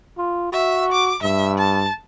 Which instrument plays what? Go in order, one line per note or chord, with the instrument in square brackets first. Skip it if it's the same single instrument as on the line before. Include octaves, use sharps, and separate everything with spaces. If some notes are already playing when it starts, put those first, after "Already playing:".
[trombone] F4
[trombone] F#4 [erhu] E5
[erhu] D6
[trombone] G2 [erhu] E5
[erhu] A5